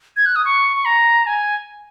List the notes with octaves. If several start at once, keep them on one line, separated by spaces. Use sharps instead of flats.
G#6
F#6
D#6
C#6
C#6
A#5
G#5